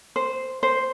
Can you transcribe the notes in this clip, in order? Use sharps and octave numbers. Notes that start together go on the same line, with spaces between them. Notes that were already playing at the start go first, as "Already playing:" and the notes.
C5
C5